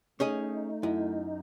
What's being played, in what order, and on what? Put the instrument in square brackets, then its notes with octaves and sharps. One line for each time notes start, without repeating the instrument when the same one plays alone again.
[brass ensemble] A3 [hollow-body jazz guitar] C#4 G#4 D#5 [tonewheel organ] D#4
[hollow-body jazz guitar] F#2 [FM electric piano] E4